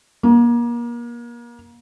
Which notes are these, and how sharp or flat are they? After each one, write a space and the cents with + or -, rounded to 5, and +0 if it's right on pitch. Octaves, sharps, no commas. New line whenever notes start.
A#3 +35